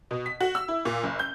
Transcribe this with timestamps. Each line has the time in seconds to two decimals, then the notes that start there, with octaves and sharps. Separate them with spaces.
0.11 B2
0.26 B6
0.40 F#4
0.55 E6
0.68 E4
0.85 A#2
1.03 F#1
1.19 G6